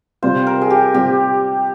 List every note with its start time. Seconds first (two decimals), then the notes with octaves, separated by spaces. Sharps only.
0.22 C3 G3 C4 F4 C5
0.47 A#4
0.61 G#4
0.70 G4
0.94 C3 G3 C4 F4 G4